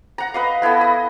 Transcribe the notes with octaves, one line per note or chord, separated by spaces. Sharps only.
F#5 A#5
B4 D#5 F5
B3 E4 A4 D#5
D#5